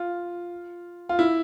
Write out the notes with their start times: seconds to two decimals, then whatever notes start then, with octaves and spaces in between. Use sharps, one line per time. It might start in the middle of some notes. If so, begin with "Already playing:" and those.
Already playing: F4
1.09 F4
1.19 E4